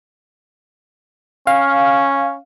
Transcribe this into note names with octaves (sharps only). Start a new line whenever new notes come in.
C#4 F5